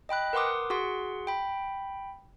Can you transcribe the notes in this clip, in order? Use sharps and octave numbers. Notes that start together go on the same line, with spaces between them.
D#5 G5 B5 F#6
A#4 B4 F#5 C6 D6 D#6
F#4 G#4 F#5 C6
G5 B5